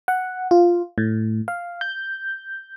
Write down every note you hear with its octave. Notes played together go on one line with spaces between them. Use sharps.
F#5
F4
A2
F5
G6